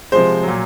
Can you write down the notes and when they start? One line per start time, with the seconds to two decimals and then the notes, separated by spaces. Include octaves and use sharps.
0.12 C3 F3 G#3 C5
0.43 F#3
0.48 A#2